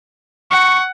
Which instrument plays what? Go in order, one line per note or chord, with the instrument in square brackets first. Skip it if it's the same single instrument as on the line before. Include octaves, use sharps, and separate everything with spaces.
[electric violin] F#5 [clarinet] C#6